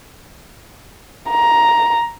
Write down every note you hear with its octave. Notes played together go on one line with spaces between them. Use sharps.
A#5